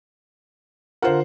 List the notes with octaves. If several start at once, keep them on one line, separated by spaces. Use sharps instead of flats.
D3 F4 A#4 C5 F#5